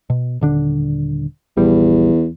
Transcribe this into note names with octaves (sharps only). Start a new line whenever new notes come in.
B2
D#1 D3 D4
A#1 E2 G3